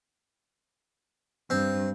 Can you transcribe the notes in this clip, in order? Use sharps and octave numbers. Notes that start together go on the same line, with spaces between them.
G2 C4